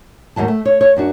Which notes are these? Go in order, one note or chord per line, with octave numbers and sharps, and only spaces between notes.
D#2 G#2 F#3 A5
A3
C#5
C#5
F#2 D4 F#4